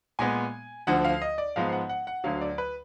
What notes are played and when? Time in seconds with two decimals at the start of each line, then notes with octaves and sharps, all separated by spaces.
0.19 A#2 G#3 B3 G#5
0.87 D2 D3 F3 F#5
1.05 F5
1.22 D#5
1.38 D5
1.56 G#2 F3 G#3 B3 F5
1.72 F#5
1.89 F#5
2.07 F#5
2.24 D2 D3 F#3 F5
2.41 D5
2.58 B4